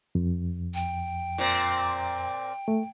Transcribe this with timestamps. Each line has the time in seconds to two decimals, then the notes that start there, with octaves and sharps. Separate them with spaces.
0.15 F2
0.74 G5
1.38 A#2 C4
2.68 A3